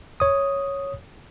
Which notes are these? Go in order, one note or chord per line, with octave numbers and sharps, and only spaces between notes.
C#5 D#6